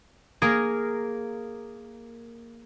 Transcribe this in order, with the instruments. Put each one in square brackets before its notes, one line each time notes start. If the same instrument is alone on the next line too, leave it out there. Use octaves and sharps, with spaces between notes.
[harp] A#3 G#4 A#4